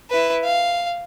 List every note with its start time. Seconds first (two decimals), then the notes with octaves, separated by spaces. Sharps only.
0.10 E4 B4
0.44 F5